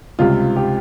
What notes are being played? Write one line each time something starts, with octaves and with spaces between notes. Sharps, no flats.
C#2 C3 G3 F4
G4